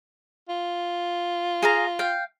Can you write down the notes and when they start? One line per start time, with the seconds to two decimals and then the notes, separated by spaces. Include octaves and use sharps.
0.49 F4
1.62 G#4 F5 A#5
1.99 F5 G5